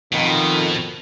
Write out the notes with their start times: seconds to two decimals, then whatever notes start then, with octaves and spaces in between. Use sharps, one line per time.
0.13 F2 B2 D#3